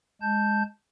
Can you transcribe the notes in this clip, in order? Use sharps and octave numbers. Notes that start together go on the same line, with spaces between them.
G#3 A5 G6